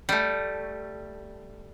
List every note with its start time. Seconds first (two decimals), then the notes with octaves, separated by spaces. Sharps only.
0.09 G3 A3